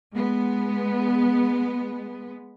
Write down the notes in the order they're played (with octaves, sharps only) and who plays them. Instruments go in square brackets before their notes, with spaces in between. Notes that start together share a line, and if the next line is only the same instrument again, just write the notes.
[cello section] G#3 B3